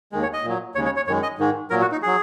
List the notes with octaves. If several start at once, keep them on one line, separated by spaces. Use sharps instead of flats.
D#2 D#3 G#3
C#5
D#5
A#2 F#3
D#2 C#3 G#3 C#5
C#5
C#5
F#2 D#3 G#3 C#5
D#5
G#2 D#3 G#3
A#2 F#3 A#4
F#4
D#4
F#3 G#4